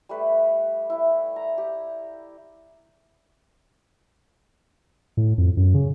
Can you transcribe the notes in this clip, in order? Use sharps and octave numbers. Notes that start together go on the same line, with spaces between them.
G3 A3 B4
E4
A#5
G4
A2
F2
F#2
C#3